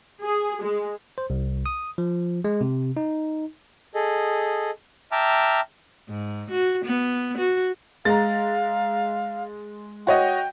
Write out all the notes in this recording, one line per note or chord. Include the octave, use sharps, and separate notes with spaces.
G#4
G#3
C5
C2
D#6
F3
G#3
C3
D#4
G#4 A4 D#5
E5 G5 A5 A#5 D6 F6
G#2
F#4
B3
F#4
G#3 F5 A#5 A6
F#4 C#5 D#5 G5